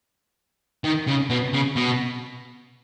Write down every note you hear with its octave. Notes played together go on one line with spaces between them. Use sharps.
D#3
C#3
B2
C#3
B2